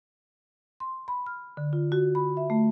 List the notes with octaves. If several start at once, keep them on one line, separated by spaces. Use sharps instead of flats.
C6
B5
F6
D3
F4
F#4
B5
E5
A3